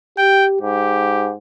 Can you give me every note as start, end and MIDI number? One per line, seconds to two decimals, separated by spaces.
0.18 0.58 67
0.18 0.46 79
0.62 1.34 44
0.62 1.32 67